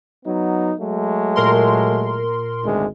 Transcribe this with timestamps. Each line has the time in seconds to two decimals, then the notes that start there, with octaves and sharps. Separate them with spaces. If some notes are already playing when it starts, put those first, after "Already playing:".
0.26 F#3 B3 D#4
0.79 F#3 G#3 A3
1.36 A#2 A#4 C6
2.64 G#1 D2 G#3